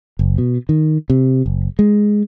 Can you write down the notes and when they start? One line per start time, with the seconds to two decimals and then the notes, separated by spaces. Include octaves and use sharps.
0.19 F#1
0.38 B2
0.69 D#3
1.10 C3
1.46 F#1
1.79 G#3